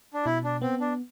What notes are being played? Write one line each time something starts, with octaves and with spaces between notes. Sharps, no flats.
D4
B2 E4
D4
B3 C4
D4